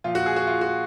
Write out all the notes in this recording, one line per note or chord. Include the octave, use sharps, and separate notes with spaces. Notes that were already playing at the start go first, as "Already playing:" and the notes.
A#2 F3 F4
F#4
G#4
F#4
F4
F#4